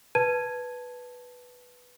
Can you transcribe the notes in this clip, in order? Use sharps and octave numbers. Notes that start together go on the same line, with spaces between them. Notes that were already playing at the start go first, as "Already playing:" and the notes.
B4 A5 G#6 D#7